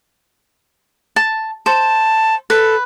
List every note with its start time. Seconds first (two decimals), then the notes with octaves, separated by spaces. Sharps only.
1.16 A5
1.66 C5 A5
2.50 A4 B4